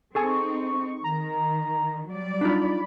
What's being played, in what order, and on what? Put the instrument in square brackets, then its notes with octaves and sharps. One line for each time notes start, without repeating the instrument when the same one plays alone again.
[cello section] C4 D#4 [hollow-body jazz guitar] G#4 A4 G#5 [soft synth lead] C#6
[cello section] D#3 [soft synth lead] A#5
[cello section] F#3 G3 D5
[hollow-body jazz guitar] D4 D#4 F4 [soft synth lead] B5